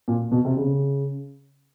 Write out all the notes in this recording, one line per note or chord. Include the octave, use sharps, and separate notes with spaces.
A#2
B2
C3
C#3